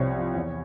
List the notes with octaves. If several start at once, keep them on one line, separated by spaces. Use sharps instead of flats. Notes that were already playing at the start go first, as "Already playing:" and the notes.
Already playing: C2 C3 F3 C5 C#5
C3 F3
E2